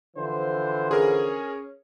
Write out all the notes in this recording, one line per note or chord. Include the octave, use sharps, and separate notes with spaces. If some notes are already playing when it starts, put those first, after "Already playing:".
D3 E3 F3 C5
C#4 G#4 A#4